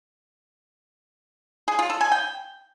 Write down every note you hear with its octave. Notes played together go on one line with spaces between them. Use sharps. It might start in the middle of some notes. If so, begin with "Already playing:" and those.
G#4
F4
A4
G#5
G5